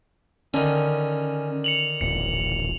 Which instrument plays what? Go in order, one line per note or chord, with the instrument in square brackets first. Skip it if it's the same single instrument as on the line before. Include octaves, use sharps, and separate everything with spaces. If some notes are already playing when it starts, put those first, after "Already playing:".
[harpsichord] D3 D#3 [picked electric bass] C#4
[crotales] C#7 F7 F#7
[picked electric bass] D#1 A1 [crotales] C#7